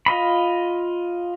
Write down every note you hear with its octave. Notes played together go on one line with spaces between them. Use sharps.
F4 D#5 B5